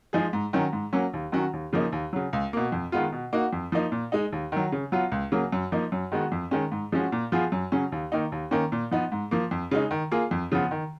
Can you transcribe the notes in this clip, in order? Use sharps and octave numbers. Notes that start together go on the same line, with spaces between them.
F3 G#3 D#4 G#4
G#2
D#3 F#3 C#4
G#2
F#3 A#3 C#4
D#2
D#3 F#3 C#4 F#4
D#2
C#3 F3 A#3 D#4
D#2
C#3 F#3
C#2
B2 A#3
F2
D#3 G#3 B3 F4
B2
A#3 D#4 F#4
F2
F3 A#3 D#4
A#2
G#3 D#4
D#2
D#3 F#3
C#3
F#3 B3 F4
C#2
C#3 F#3 A#3
F#2
F3 A#3 D#4
F#2
D#3 G#3 B3 F#4
F2
D#3 G#3 C#4
G#2
F3 G#3 C#4 F#4
A#2
F3 B3 F4 G#4
F#2
C#3 F#3 C#4
D#2
D#3 A#3 D#4
D#2
D#3 A#3 C#4
A#2
F3 B3 D#4
G#2
F3 A#3
F2
C#3 G#3 D#4
D#3
A#3 F4 G#4
F2
C#3 F3 B3
D#3